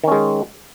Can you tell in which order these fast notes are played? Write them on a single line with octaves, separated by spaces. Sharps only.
D#3 C#4 G#3